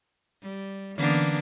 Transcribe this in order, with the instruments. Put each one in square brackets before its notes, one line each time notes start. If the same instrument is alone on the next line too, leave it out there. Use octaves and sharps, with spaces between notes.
[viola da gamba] G3
[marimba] D3 E3 C#4 [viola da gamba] A#3 B3 D4